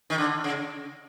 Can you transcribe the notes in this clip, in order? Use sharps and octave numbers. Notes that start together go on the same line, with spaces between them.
D#3
D3
C#3